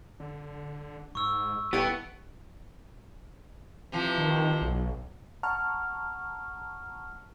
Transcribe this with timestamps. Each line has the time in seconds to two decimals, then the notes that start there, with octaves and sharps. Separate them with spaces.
0.20 D3
1.15 G#2 C#6 E6
1.73 D#1 A3 B3 E4 G4 A6 D7
3.92 C3 E3 F3
4.18 D#3
4.62 B1
5.43 F#5 A5 A#5 C#6 F6